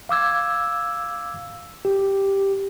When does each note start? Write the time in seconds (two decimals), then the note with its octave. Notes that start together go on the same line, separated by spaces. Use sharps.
0.09 F5 D6 E6 G#6
1.85 G4